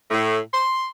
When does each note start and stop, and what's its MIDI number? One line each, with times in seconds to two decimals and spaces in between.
0.11 0.38 45
0.54 0.86 84